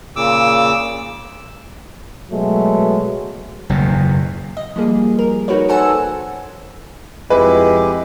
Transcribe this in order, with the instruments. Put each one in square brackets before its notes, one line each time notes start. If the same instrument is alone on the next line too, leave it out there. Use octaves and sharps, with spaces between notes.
[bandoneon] A#2 C#3 D6 E6
[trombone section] B2 F#3 G#3 A3
[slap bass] F#1 E2 B2
[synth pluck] D#5
F3 G3 A#3 G#4
A#4
D#4 F#4 A#4 B4 C#5
A4 C5 F#5 G#5 A5 E6
[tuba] F2 [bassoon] G#3 [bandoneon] E4 G4 [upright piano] B4